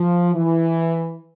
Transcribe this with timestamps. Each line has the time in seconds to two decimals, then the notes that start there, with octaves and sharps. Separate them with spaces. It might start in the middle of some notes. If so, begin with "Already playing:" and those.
Already playing: F3
0.35 E3